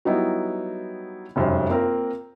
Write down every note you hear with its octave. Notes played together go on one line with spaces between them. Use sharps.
F#3 G3 B3 D#4 E4
F1 F#2 G3 C5
A#3 C4 F4 A#4